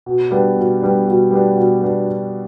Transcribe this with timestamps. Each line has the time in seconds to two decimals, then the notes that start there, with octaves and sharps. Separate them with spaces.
0.06 B2
0.31 G3 B3 D4
0.56 B2
0.81 G3 B3 D4
1.07 B2
1.31 G3 B3 D4
1.56 B2
1.82 G3 B3 D4